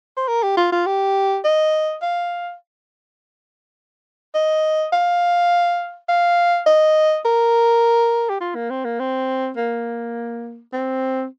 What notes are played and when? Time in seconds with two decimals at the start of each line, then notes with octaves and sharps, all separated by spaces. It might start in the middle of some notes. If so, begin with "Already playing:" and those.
0.17 C5
0.28 A#4
0.43 G4
0.57 F4
0.72 F4
0.86 G4
1.45 D#5
2.02 F5
4.35 D#5
4.93 F5
6.09 F5
6.67 D#5
7.25 A#4
8.29 G4
8.41 F4
8.55 A#3
8.70 C4
8.85 A#3
8.99 C4
9.57 A#3
10.73 C4